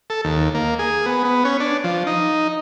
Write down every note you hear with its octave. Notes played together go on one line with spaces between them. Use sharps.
A4
D#2
A#3
G#4
B3
B3
C#4
D4
F3
D#4